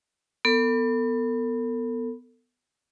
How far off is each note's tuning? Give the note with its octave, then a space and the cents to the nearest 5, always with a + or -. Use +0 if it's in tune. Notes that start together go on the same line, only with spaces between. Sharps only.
B3 +0 A4 +40